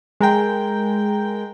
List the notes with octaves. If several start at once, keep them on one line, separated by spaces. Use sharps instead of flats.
G#3 A#4 G5